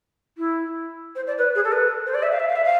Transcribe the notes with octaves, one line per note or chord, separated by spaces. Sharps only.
E4
C5
D5
B4
G#4
A4
B4
C5
D5
E5
F5
E5
F5
E5
F5